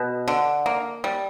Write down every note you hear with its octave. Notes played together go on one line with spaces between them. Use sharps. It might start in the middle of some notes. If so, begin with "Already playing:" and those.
Already playing: B2
D3
A#3
G3